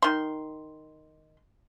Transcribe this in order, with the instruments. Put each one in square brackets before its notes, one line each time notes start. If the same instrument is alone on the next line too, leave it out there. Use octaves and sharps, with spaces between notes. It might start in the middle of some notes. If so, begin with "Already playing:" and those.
[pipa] D#3 C6